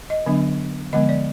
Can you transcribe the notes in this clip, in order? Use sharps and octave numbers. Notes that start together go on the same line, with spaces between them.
D#5
D3 F#3 B3 D4
D3 F3 G#3 B3 D#5
D5